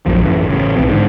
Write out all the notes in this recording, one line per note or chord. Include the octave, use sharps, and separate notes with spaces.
A#1 F#2 F3
A1 F#2 E3
A1 C#3
B1 E3 C4
G#2 D3